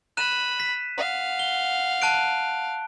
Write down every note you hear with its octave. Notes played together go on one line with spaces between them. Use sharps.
B5 F#6 D#7 E7
B6
F5 F#5
G7
A5 F#6 D7